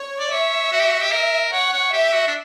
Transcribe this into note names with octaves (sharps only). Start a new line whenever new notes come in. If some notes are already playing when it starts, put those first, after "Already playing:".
Already playing: C#5
D5
C#5 E5
F#4
G4
F#4
G4
A#4
C#5 F#5
C#5
G4 E5
F#4
D4